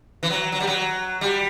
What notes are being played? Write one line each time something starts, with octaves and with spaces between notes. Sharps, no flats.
E3
F#3
F#3
G3
F#3
G3